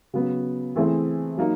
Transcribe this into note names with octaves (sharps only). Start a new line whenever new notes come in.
C#3 F#3 B3
E3 A3 C4 E4 G#4
F#3 A#3 D#4